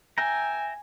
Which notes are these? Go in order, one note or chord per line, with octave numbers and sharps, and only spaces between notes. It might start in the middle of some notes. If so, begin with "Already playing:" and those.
E5 G5 G#5 A#5